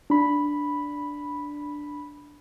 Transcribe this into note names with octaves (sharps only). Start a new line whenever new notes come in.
D4 B5